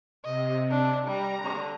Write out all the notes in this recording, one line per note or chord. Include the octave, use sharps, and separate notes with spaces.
C3 D#5
D4
G3 A#5
D3